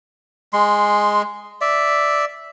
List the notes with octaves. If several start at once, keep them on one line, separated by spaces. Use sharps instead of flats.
G#3 C6
D5 E5